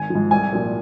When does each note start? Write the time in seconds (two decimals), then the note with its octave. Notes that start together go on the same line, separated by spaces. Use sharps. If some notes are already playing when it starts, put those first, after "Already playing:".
Already playing: G#1 G#5
0.10 F3
0.15 G#2
0.31 C2 G#5
0.53 A#2 F3